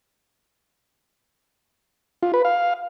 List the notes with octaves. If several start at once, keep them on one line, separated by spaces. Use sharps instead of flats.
F4
B4
F5